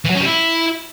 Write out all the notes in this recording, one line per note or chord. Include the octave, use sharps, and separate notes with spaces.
E3
F#3
C#4
G3
E4